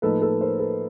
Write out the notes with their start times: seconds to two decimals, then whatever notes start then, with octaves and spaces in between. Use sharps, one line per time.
0.02 A2 F3 A#3 D#4 A4 B4
0.21 A4 B4
0.41 A#4 C5
0.59 A4 B4